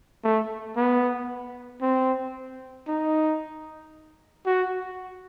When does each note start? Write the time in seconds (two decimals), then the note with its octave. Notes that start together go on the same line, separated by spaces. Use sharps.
0.24 A3
0.76 B3
1.82 C4
2.88 D#4
4.46 F#4